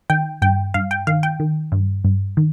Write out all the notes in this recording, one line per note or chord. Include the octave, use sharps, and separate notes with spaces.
D#3 G5
G2 G5
G2 F5
G5
D#3 F5
G5
D#3
G2
G2
D#3